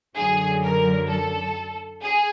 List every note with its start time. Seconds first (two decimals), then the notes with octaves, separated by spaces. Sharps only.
0.16 F#2 D3 F#3 G#4
0.62 A#4
1.09 A4
2.02 G#4